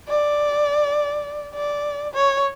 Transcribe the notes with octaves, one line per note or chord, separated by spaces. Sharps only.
D5
D5
C#5